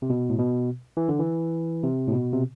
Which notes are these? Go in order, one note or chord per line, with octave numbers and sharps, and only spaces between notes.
C3
B2
A2
B2
E3
D3
E3
C3
A2
B2
C3